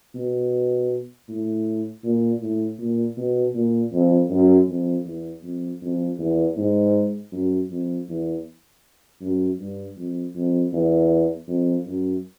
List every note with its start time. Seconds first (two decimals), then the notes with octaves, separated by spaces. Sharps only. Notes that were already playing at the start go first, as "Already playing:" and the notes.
0.14 B2
1.28 A2
2.04 A#2
2.41 A2
2.79 A#2
3.17 B2
3.55 A#2
3.93 F2
4.30 F#2
4.68 F2
5.06 E2
5.43 F2
5.82 F2
6.18 E2
6.57 G#2
7.32 F#2
7.70 F2
8.09 E2
9.21 F#2
9.59 G2
9.97 F2
10.35 F2
10.73 E2
11.48 F2
11.86 F#2